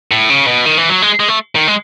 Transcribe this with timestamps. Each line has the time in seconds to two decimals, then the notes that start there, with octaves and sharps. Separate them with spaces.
0.11 A2
0.30 C#3
0.47 B2
0.66 D#3
0.78 E3
0.89 F#3
1.02 G#3
1.20 G#3
1.28 A3
1.55 D#3
1.68 G#3